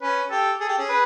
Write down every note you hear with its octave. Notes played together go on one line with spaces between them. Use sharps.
C#4 B4
G4 A4
G#4 A4
G4
C#4 G#4
B4